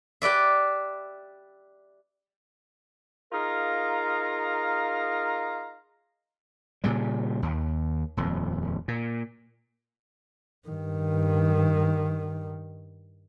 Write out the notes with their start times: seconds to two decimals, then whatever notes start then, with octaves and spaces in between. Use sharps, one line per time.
0.22 G4 B4 D5 E5
3.32 D#4 F4 G#4 A#4 F5 A#5
6.84 A#2 C#3 G3
7.42 D#2
8.17 D#1 F2
8.88 A#2
10.68 G2 D#3